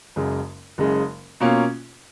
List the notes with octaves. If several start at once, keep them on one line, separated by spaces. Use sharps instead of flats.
F#1 F#2 C#3 G#3
F#1 F#2 C#3 G#3
B2 A#3 C#4 F4